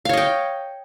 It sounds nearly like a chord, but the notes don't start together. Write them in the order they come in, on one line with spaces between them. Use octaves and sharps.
F5 C#5 D#5 G5